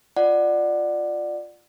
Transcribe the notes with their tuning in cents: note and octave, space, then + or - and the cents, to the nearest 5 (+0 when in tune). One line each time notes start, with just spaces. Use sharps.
F4 +0 D5 +20 F#5 +0